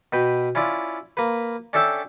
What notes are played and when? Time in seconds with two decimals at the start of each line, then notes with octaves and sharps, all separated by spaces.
0.13 B2 B4 G5
0.55 C#4 E4 F4 D5
1.17 A#3 B4
1.73 C#4 D4 A4 E5 G5 A5